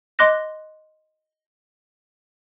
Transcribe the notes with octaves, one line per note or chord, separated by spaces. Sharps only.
D#5 C6 D6 F#6 A#6